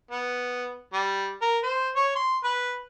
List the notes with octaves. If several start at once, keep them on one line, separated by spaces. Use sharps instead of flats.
B3
G3
A#4
C5
C#5
C6
B4